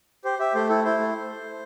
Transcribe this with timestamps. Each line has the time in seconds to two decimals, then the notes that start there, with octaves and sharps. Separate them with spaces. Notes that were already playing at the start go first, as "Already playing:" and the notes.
0.24 G4 C5
0.39 G4 E5
0.54 A3 C5
0.69 E4 A4
0.84 E4 C5
0.99 A3